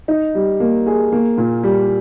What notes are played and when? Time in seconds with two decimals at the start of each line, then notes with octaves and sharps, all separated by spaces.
0.08 D#4
0.35 G3
0.60 A#3
0.86 G#4
1.12 A#3
1.38 A#2
1.63 G3